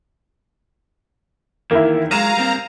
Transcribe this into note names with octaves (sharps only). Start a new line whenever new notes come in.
E2 D#3 A#3 E4
F#3 G#3 F5 A#5 D#7 E7
G3 A#3 C4